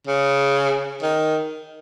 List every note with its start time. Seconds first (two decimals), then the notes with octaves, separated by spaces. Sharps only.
0.07 C#3
1.03 D#3